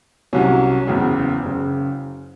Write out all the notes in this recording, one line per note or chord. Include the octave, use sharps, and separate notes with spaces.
C2 C3 F#3 C#4
F#1 E2 C#3
F#1 C#3